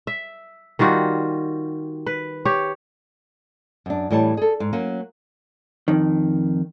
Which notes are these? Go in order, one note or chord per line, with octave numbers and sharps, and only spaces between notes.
E5
D#3 G3 F4 F#4
B4
G4 C#5
F#2 D4
A2 E3 G3 C#5 A5
G#4 A4
G#2
F#3 A#3 C#4
F2 D#3